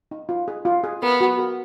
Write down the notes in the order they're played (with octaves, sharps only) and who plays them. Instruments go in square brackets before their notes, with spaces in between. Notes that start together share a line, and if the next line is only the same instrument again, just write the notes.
[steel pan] D#4
F4
G#4
F4
G#4
[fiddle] B3 [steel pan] A#4
[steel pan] F#4
A#4